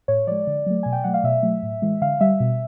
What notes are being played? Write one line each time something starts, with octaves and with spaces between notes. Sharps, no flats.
A2 C#5
F3 G#3 D5
D3
F#3 A3
B2 G#5
G5
F#3 A3 F#5
F5
B2 E5
F#3 A3
A2
E3 G#3
D3 F5
G3 E5
B2